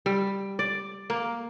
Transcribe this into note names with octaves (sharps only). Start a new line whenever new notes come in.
G3
D5
A#3